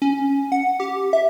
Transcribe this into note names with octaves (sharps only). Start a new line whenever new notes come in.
C#4
F#5
G4
E5